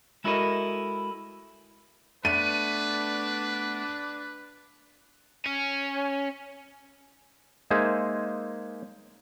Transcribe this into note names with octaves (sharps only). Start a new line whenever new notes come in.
G#3 E4 F#4 A4 A#4 D#5
A3 B3 D4 B4 D#7
C#4
G#3 A#3 D#4 G#4 C5 E5